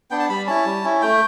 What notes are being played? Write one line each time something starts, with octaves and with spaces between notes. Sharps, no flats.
B3 D4 G5
A5
G3 B5
C#4 E4 A5
G3
C#4 E4
A3 G5